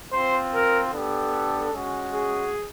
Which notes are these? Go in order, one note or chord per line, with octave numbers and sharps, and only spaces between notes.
C4 F4 C5
A#4
B3 D4 G4 A4
G#3 C#4 F#4
G#4